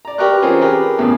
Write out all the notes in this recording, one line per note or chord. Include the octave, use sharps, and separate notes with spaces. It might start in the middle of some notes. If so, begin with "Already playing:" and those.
D5 A#5
G4 A#4 B4 A#5 C#6 F#6
E3 C4 C#4 F4 G#4
G4 G#4 A#4 B4
E2 A2 C#3